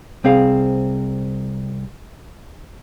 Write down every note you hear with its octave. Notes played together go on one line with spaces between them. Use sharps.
C2 C4 G#4 F5